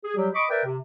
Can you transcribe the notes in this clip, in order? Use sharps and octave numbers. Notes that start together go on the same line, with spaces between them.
G#4
F#3 G3 G4
D#5 B5 C#6 D6
A#4 B4 D5 E5 G5
C3